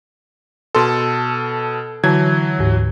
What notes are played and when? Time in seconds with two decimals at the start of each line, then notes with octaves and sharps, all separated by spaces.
0.75 B2 A4 C6
2.04 D3 E3 F#3 A5 G#6
2.58 D2 G#2